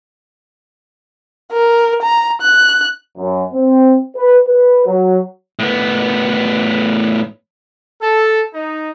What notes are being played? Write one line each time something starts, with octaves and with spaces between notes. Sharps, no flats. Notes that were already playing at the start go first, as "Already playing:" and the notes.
A#4
A#5
F#6
F#2
C4
B4
B4
F#3
A2 B3
A4
D#4